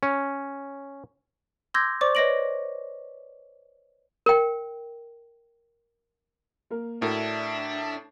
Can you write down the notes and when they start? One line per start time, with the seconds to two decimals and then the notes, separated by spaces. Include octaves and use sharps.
0.03 C#4
1.74 C6 D6 E6 G6 G#6 A#6
2.01 C5 D5 C#6 D6
2.15 B4 C#5 D#5 A#6 D7 F#7
4.26 A#4 G5
6.71 A#3 A#4
7.02 A2 D4 F#4 A#4 E5